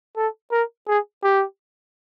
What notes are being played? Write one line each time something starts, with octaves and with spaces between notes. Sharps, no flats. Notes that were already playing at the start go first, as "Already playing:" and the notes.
A4
A#4
G#4
G4